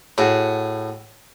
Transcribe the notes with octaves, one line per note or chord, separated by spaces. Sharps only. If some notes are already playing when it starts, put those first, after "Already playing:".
A2 F#4 G#4